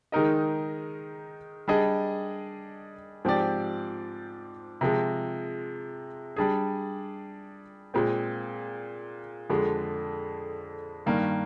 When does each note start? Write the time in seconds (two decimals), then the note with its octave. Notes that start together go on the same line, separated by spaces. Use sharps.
0.12 D#3 G#3 D#4 A#4 D#5
1.68 G3 D4 G#4 D#5
3.25 G#2 F3 C4 G4 D5
4.81 C3 F3 G#3
6.36 G3 D4 G#4
7.94 A#2 G#3 C4
9.50 F2 D3 G#3
11.06 G2 D#3 A#3